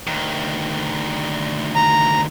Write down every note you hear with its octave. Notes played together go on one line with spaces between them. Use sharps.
D2 D#3
A#5